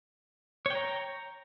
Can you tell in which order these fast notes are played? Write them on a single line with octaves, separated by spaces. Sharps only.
C#5 G5 A#5